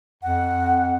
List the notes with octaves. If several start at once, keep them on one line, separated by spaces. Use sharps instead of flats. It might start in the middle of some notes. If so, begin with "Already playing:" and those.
F2 F#5